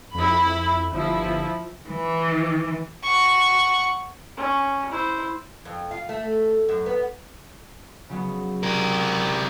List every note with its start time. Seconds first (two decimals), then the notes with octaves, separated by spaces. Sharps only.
0.14 F2 E4 B5
0.92 G1 F3 E4
1.89 E3
3.03 F#5 C#6
4.37 C#4
4.91 E4 C5
5.65 F2
5.91 F4
6.09 A3
6.69 F#2
6.86 B3
8.09 C#3 F#3 B3
8.63 C3 A#4